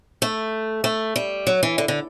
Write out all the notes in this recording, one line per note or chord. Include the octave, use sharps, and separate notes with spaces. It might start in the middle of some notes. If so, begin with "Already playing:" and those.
A3
A3
G3
F#3
E3
D3
D3